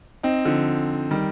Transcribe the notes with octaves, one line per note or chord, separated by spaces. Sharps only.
C4 D#4
D3 F3
D#3 G3